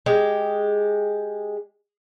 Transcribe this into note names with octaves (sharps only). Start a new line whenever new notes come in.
G#3 G4